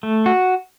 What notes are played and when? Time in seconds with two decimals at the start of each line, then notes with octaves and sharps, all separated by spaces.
0.03 A3
0.26 F#4